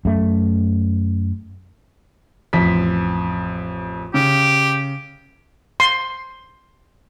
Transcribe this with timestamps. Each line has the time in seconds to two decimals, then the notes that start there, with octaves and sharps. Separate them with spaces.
0.05 F#2 A3
2.53 A1 F2 B6
4.14 C#3 G4
5.80 C6